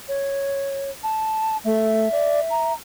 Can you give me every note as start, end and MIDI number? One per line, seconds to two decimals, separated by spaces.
0.08 0.91 73
1.03 1.57 81
1.65 2.08 57
1.65 2.73 76
2.12 2.40 74
2.50 2.73 82